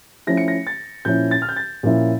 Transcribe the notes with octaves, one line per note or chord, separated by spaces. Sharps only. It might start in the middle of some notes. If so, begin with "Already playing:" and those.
F3 A3 C#4 E4 A#6
C#7
A#6
A6
A#2 F3 C#4 E4 G6
A6
F6
G6
A6
A#2 F3 C#4 E4